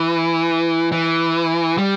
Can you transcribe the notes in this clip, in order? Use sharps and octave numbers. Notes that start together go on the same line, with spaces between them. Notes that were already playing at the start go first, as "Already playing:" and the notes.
Already playing: E3
E3
G3